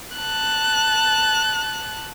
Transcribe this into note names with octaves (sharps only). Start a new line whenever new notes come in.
A5 F#6